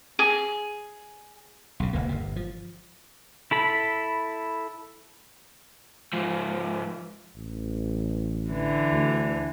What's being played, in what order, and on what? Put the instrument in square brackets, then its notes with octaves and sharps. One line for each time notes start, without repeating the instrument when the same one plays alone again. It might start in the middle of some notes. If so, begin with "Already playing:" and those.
[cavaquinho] G#4
[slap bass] B1 C#3
D1 G#1 C#2 A#3
G1 A#2
F3
[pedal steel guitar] E4 A4 B5
[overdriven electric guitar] G#2 F3
[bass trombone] A1
[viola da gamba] D3 E3
[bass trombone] D2